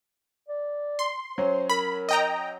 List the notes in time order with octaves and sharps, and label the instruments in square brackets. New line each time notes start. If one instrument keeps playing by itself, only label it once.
[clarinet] D5
[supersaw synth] C6
[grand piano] F#3 C#4 [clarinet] C5
[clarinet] A#4 [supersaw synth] B5
[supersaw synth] D#5 G5 A#5